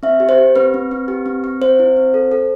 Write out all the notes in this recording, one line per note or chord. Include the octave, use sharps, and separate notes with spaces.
C4 E5
G4
C5
G4
C4 B4
C4
C4
G4
C4
C4
C4 C5
E4
C4
A4
A4